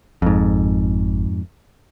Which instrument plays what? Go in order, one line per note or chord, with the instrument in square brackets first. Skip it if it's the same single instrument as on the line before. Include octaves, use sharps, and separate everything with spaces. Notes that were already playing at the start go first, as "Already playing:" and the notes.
[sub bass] G1 [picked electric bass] F2 G#2